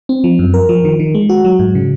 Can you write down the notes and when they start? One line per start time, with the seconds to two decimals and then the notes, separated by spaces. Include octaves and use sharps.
0.09 C4
0.24 F3
0.39 F#2
0.54 A#4
0.69 F3
0.85 D#3
0.99 D#3
1.15 G#3
1.29 F#4
1.45 F#3
1.59 G#2
1.75 C#3